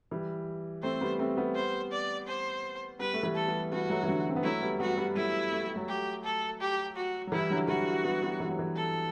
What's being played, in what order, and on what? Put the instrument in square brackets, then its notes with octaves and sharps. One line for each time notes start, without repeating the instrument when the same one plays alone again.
[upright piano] E3 G3
[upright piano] A3 C4 [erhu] C5
[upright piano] G3 B3
A3 C4
G3 B3
[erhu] C5
D5
C5
[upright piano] G3 B3 [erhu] B4
[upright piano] A3
E3 G3
[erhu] A4
[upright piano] G3 B3
[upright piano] G3 B3 [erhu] F#4
[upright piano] F#3 A3
E3
D3 F#3
C4
B3
[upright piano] F#3 A3 [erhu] E4
[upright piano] G3 B3
[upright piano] G3 B3 [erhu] F#4
[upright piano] G3 B3
[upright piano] F#3 A3 [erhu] E4
[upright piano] A3
G3
F#3 A3
[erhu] G4
A4
G4
F#4
[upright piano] F#3
[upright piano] E3 G3 [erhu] E4
[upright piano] D3 F#3
[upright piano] E3 G3 [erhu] F#4
[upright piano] G3 B3
G3 B3
E3 G3
F#3
E3
[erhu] A4